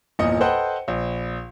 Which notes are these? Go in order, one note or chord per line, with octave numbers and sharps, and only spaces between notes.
G1 E2 A#2 D#5 C#7
A4 B4 C5 D#5 F#5 G5
A#1